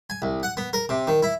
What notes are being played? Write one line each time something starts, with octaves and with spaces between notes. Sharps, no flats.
G#5
C2
F#5
B3
A#4
C3
D#3
E4